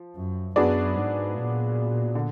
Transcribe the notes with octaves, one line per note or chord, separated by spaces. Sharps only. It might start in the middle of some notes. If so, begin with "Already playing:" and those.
Already playing: F3
F#2
F#2 F#3 B3 D4 G#4 D5
G#2
A#2
D3